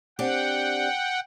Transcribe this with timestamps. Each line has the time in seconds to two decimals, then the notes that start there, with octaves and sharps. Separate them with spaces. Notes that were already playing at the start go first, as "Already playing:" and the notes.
0.19 C4 D4 G4 F#5 G5